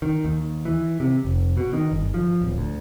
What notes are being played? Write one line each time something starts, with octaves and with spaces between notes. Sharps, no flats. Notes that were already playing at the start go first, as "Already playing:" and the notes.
D#3
D#2
E3
C3
F1
B2
D#3
G1
F3
D1
D2